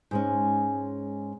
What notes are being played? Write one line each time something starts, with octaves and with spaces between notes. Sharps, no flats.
G#2 G#3 C#4